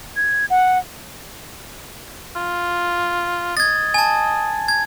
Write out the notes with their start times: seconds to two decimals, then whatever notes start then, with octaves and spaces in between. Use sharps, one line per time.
0.16 G#6
0.50 F#5
2.36 F4
3.57 D#5 G#6 A6
3.94 G#5 A5
4.68 G#6